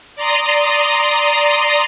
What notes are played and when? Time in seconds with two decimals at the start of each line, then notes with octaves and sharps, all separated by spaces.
0.15 D5 A#5 C6 D#6